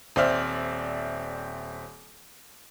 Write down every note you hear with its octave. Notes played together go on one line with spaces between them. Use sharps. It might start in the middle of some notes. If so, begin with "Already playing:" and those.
D#1 C4 C5 D5 E5 F6